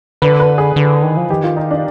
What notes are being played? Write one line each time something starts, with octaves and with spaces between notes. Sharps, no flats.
D3 B4
B4
G#4
D3
D#3
F3
D#3 G4
F4
D#4
D4